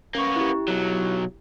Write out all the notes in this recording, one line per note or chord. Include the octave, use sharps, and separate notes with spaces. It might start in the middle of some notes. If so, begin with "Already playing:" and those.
A#3 B3 C#4 C#6
E4 G4
B1 F#3